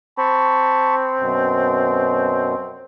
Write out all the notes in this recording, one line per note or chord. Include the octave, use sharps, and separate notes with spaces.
C4 A5 B5 C#6
F#2 B2